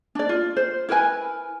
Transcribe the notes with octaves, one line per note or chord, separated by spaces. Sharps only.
D4 D5
F4
C5
E4 A#4 B4 G#5